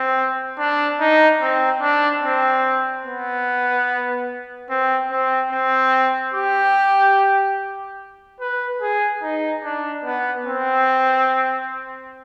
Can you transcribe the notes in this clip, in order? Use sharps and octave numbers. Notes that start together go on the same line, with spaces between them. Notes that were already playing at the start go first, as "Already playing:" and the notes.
Already playing: C4
D4
D#4
C4
D4
C4
B3
C4
C4
C4
G4
B4
G#4
D#4
D4
B3
C4